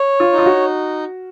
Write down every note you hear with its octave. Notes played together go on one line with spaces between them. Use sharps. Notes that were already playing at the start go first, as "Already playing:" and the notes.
Already playing: C#5
F4
D#4
F4
F#4